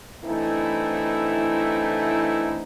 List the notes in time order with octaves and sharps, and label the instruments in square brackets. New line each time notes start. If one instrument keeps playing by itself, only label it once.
[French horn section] D3 E3 A3 C4 D#4 E4